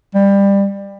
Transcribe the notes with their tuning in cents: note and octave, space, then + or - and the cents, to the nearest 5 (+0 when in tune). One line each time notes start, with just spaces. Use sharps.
G3 +20